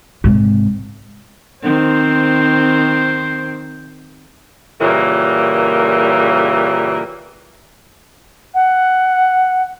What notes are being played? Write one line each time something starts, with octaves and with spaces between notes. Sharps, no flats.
G#2 C3
D#3 C4 C5
A#2 C#3 E3 G3 A#3
F#5